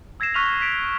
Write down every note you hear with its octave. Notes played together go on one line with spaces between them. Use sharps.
E6 G#6 A#6 C7 E7
C#6 F6 F#6 B6 E7 F7
B6 D7